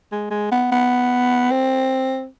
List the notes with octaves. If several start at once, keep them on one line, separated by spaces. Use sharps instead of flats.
G#3
G#3
B3
B3
C4